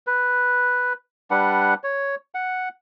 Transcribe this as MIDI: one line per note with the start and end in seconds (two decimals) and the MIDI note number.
0.07 0.93 71
1.31 1.74 55
1.31 1.74 62
1.31 1.74 71
1.31 1.74 78
1.84 2.15 73
2.34 2.69 78